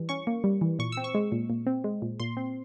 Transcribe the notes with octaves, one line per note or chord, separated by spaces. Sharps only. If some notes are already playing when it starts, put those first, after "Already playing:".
Already playing: E3 G3
C#4 C#6
A#3
G3
E3
A#2 C#6
C4 E6
C#6
G#3
A#2
A#2
C4
G#3
A#2
A#2 C6
C4